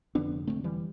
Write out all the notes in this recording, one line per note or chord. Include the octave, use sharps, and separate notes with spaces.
F1 F2 D3 B3 D4
F1 F2 D3 A3 C4
E3 G3